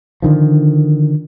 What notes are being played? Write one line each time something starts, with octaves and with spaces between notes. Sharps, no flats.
D3 D#3 F3